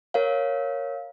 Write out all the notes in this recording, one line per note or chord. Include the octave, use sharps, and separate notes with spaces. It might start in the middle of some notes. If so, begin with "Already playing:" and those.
A#4 C#5 F5